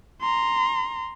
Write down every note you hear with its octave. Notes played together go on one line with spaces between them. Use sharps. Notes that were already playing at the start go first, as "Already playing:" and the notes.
A#5 C6